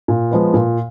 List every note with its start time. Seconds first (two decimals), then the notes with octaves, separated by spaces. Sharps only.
0.08 A#2
0.31 F3 G#3 B3
0.54 A#2